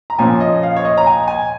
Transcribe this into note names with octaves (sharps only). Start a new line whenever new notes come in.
A#5
A#2 F3 C#4 G#5
D#5
F5
C#5
D#5
A#5
G#5
G#5